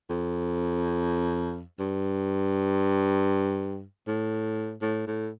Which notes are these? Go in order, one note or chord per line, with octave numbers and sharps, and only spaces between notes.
F2
G2
A2
A2
A2